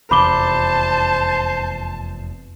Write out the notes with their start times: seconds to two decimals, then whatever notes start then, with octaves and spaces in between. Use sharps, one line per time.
0.11 F1 E2 C5 A5 B5 D6 G7